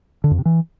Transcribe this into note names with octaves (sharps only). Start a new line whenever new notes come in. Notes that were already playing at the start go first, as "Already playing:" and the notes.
D3
F2
C3
E3